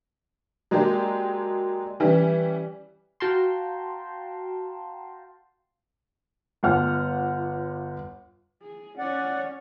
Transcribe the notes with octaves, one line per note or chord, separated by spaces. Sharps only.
F#3 G#3 A#3 D4 G4
E3 G3 C#4
F#4 F5 G5 A5 A#5 C6
G1 F4 F#5 F6
G#4
C#4 C#5 D5 F#5